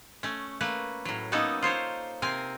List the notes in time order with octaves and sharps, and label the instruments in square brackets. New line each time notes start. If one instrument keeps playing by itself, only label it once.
[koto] A3 C#4
A3 A#3 B4
A2 F#3
A#3 B3 C#4 D#4 A4
F4 C5 C#5
C3 C4 A#4 G#5